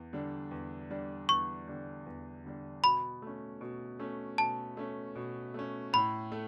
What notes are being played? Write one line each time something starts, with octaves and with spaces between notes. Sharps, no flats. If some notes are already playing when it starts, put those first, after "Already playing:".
Already playing: E2
D3 G3 D4
E2
D3 G3 D4
E2 C#6
D3 G3 D4
E2
D3 G3 D4
B2 B5
A3 C#4
B2
A3 C#4
B2 A5
A3 C#4
B2
A3 C#4
A2 B5
A3